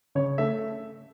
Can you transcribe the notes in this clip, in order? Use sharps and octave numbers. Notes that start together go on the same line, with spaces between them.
C#3 C#5
A3 E5